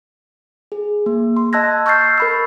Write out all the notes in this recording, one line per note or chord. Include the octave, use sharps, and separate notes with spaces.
G#4
A#3
C6
D#5 A5 E6 F#6 G#6 A#6
C#6 E6 F6 G6 A6 C7
A#4 B5 E6